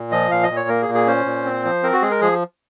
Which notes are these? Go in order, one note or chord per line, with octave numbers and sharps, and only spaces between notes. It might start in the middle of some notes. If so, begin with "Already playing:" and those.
Already playing: A#2
F3 D#5
A#2 F5
D#5
A#2
C#5
A#3 A#4
G#4
A#2
G#4
C#4 C5
A#2
C4
F3
C4 A#4
F#4
G#3 G#4
A#4
F3 G#4